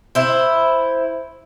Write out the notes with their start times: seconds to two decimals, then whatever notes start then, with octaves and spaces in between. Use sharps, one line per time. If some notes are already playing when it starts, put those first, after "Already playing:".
0.15 E4 C5